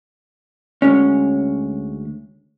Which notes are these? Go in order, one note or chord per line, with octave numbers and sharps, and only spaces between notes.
D2 G#3 C#4